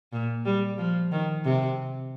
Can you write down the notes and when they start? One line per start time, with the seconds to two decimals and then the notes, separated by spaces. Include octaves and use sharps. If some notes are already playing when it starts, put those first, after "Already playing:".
0.13 A#2
0.45 G3
0.78 F3
1.12 D#3
1.45 C3